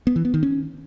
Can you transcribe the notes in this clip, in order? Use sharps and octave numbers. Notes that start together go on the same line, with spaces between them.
B3
E3
B3
D#3
C#4